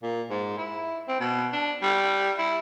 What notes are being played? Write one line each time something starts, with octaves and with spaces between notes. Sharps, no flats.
A#2
G#2
E4
C4
B2
D4
G3
E4